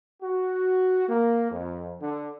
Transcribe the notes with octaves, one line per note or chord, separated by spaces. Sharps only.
F#4
A#3
F2
D3